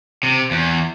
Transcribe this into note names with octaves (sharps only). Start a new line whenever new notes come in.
C3
E2